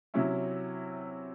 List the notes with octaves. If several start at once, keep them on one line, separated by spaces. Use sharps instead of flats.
C3 F#3 C#4 E4